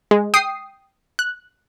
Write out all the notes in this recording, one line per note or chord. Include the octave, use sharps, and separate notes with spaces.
G#3
G5 D#6 C7
F#6